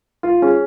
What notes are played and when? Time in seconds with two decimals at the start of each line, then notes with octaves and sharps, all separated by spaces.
0.23 F4
0.42 C#4 G#4